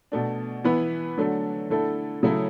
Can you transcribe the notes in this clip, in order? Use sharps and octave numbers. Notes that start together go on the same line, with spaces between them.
B2 A3 D4
E3 B3 E4 B4
D3 F#3 A3 D4 A4
D3 A3 E4 A4
C#3 F#3 A3 E4